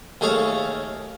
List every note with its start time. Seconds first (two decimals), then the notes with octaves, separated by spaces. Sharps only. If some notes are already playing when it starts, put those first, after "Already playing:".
0.21 D#2 A3 G#4 A4 C#5 F5